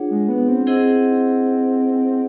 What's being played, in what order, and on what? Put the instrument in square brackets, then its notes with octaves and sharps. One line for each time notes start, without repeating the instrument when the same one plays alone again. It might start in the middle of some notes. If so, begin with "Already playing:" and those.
Already playing: [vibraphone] D4 F4 G#4 C#5 F#5
[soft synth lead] G#3
B3
C4
[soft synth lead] C4 [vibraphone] E4 G#4 C5 D#5 F#5